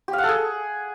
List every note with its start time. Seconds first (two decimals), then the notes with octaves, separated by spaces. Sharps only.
0.08 G4
0.13 F5
0.18 F#5
0.23 A4
0.29 G#4